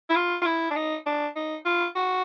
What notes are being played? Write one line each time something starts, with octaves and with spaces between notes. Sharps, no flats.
E4
F4
F4
E4
D4
D#4
D4
D#4
F4
F#4